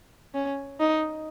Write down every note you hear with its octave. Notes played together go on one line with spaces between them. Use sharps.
C#4
D#4